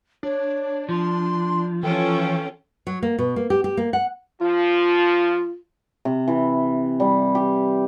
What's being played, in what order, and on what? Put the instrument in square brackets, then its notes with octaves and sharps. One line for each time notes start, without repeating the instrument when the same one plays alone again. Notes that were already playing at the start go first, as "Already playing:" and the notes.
[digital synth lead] D4 [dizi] C#5
[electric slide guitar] F3 [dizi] C6
[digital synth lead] E3 [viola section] C#4 F4 A4 [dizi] G5
[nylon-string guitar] F#3
A#3
B2
A#3
G4
G4
A#3
F#5
[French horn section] F3 [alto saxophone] F4
[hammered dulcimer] C3
E3
G3
G4